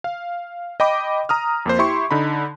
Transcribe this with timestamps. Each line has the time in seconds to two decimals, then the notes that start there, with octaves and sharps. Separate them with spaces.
0.04 F5
0.80 D#5 G5 B5 D6
1.29 A#5 D#6 F6
1.66 F2 A#3 C5
1.79 E4 G4 C6 C#6
2.11 D3 D#4 B5